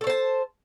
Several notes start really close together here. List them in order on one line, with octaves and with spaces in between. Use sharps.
A4 C#5 C5 A5